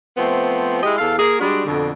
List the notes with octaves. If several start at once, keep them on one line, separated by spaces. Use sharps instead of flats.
F3 A3 B3 C4
G#3 E4 G4 D#5
E2 A4 F5
A#3 G#4
G3 G#3 D4 F#4
F2 B2 D3